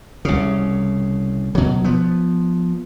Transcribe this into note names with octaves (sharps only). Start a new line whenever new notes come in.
C2 C#3
B2 F#3
F3 B3